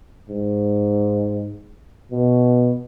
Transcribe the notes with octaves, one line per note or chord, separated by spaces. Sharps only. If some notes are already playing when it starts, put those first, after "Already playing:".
G#2
B2